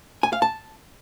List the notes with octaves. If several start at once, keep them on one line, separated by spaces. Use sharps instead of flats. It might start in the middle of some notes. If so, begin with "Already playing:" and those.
G#5
F5
A5